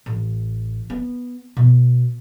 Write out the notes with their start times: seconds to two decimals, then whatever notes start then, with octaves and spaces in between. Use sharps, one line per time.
0.06 A1
0.90 B3
1.57 B2